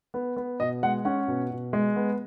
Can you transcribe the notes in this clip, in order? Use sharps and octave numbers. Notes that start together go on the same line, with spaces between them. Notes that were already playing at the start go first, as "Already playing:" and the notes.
B3
B3
B2 D#5
G#3 F#5
C#4 F#5
B2
B2
G#3
B3